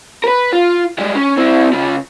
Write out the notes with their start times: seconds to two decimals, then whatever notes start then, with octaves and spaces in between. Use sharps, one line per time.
0.24 A#4 B4
0.53 F4
0.98 G3 G#3
1.15 C#4
1.37 C4 E4
1.73 C#3 F4